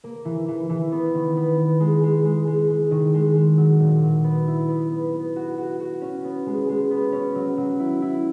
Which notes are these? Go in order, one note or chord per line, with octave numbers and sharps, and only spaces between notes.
A#3
E3
E3
E3
B3
D#3
B3
B3
G#3
G#3
G#3
G#3
G#3
D#3
G#3
G#3
F#3
A#2
F#3
B3
E4
B3
B3
B3
F#4
F#4
F#4
C#4
B3
G#3
G#3
B3
C#4
F#3
F#3
E4
E4